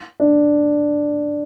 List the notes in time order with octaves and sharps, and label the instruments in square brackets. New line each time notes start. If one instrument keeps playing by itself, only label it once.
[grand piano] D4